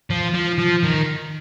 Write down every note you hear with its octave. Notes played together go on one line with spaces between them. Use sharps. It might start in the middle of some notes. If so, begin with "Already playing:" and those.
F3
F3
F3
D#3